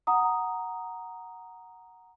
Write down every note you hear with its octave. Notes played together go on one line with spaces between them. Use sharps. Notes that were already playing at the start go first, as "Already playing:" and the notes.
F#5 A#5 D#6